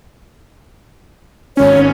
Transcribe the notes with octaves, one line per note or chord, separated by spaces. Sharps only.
G#1 C#4 C#5